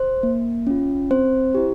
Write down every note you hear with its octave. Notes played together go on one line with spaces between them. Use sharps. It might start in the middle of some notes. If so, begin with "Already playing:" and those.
Already playing: C5
A#3
C#4 F4
C4 C5
E4 G4